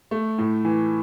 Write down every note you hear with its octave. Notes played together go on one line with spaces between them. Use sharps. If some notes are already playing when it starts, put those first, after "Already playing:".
A3
A2
E3